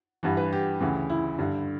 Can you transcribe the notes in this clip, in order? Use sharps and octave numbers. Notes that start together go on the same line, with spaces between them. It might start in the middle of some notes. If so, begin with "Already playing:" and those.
G2 E3 F#5
B4
G4
D2 C#3 E3
E4
G2 D3